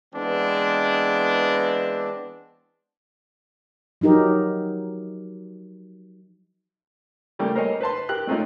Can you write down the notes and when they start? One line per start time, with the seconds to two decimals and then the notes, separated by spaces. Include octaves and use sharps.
0.14 E3 G#3 B3 C4 D4
4.01 F3 F#3 D#4 G4 A#4
7.39 C#3 G3 A3 A#3
7.55 G4 A#4 C5 C#5 D#5 G#5
7.81 B4 C5 A5 C6
8.09 G4 A#4 F#6
8.27 G#3 A3 C4 C#4 D#4 F4